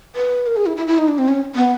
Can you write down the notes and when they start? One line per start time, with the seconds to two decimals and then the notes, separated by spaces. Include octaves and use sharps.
0.16 B4
0.47 A#4
0.56 G#4
0.66 E4
0.77 E4
0.87 E4
0.98 D#4
1.08 D4
1.18 C4
1.28 C#4
1.55 B3